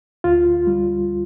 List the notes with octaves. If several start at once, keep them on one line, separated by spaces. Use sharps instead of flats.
D2 F4
G3